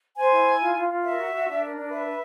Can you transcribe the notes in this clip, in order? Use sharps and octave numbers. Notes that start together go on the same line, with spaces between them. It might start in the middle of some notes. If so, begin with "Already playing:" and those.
C5 G#5
E4
E4
F4
F4
F4
A#4 E5
F#4
F#4
D4
A#4
D4
B4 E5
B4